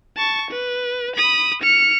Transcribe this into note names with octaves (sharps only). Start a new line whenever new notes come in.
A5 C#6
B4
B5 D#6
F6 C#7